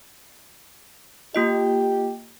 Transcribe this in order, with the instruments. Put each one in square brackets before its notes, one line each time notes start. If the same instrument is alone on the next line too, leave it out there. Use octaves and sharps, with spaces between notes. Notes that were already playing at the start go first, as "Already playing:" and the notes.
[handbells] A#3 F4 D#5 [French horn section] G4